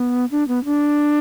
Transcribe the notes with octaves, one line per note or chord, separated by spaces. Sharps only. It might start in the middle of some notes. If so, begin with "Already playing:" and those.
Already playing: B3
D4
B3
D4